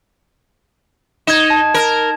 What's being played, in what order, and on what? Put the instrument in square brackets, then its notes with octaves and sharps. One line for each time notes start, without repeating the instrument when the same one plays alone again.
[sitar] D#4 [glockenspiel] G#6 E7
[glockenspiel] A5
[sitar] A#4